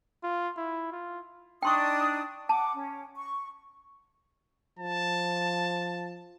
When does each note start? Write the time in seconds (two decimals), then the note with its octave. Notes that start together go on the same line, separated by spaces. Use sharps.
0.23 F4
0.57 E4
0.92 F4
1.62 D4 D#4 G5 C6 C#6 D#6
2.49 F#5 A5 D6
2.74 C#4
3.17 C#6
4.79 F3 A5